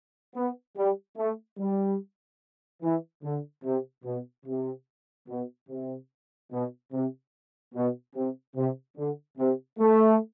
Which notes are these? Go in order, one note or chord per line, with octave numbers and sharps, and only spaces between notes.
B3
G3
A3
G3
E3
D3
C3
B2
C3
B2
C3
B2
C3
B2
C3
C3
D3
C3
A3